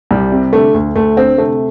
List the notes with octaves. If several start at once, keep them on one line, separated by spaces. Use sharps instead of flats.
C2 G3
C3
D3 A3
D2
D2 A3
D3 C4
C3 A3